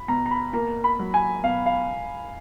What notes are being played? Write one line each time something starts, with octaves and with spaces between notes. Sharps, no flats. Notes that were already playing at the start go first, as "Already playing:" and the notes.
Already playing: B5
B2 A#5
A#5
B5
A#3 A#5
B5
F#3
G#5
B2 F5
F5